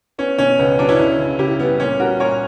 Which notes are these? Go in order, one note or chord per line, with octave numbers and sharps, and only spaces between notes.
B3 C#4
B2 C#4
C#2 B3
F#3 B3 D4
C#4 E4
C#2
C#3
C#2 E4 G4
G3 B3
A#2 C#4
G3 F#4 A#4
A#2 A#4 C#5